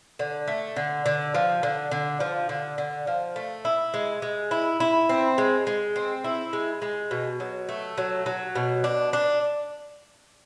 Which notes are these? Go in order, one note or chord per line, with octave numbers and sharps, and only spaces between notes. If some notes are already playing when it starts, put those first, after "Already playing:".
D3
A3
D3
D3
F3
D3
D3
F3
D3
D3
F3
A3
E4
G#3
G#3
E4
E4
C4
G#3
G#3
C4
E4
G#3
G#3
B2
F#3
A3
F#3
F#3
B2
D4
D4